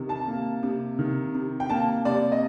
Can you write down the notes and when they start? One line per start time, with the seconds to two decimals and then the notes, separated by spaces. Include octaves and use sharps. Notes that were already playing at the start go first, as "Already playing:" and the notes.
Already playing: C3 D#3
0.09 A5
0.28 A#3
0.63 C3
0.99 D#3
1.34 C3
1.60 G5
1.70 A#3 A5
2.05 C3 D5
2.32 D#5